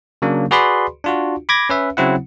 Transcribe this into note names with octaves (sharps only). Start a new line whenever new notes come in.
C#3 F#3 A#3 D4
F#4 G#4 B4 D5 B5 C6
D4 F4 F#4
B5 D6 G#6 A#6
C#4 B4 E5
C#3 F#3 C4 E4 F#5